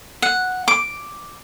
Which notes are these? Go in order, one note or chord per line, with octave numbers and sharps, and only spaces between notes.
F#5
D6